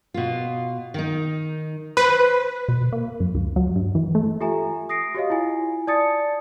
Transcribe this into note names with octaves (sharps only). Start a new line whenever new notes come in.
B2 F4
D#3 D#4
B4 C5
B2
A#3
F#2
D2
F#3
G2
E3
A3
F4 G4 A4 E5 G#5 A#5
D#6 A#6 C7 D7
F#4 G4 C#5 D#5 F5
E4 F4 G#5
D5 A5 D#6 A6 C#7